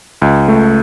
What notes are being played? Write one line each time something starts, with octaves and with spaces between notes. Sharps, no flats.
C#2
A3